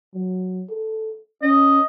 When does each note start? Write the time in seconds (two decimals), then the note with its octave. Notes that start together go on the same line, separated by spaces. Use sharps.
0.14 F#3
0.70 A4
1.42 C#4 D#5